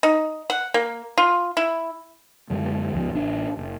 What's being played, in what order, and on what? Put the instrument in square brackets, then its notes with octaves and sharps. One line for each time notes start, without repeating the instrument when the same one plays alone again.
[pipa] D#4
F#5
A#3
F4
E4
[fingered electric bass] F#2 D3 G#3
C#2 G#2 F3
A1 D4
F#1